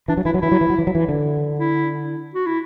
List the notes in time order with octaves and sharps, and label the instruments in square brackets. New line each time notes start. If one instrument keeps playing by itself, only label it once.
[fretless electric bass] E3 [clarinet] D4
[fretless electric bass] F#3
[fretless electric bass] E3 [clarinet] E4
[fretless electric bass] F#3
[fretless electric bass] E3 [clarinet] E4
[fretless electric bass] F#3
E3
F#3
E3
F#3
E3
D3
[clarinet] E4
F#4
E4